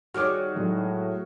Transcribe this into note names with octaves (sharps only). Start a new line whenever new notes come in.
D#3 G3 F#4 G#4 C#5 D6 F6
A2 F#3 G#3